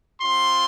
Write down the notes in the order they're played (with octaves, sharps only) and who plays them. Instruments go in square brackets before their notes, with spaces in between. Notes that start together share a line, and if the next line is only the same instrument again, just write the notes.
[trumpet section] C4 F4 C6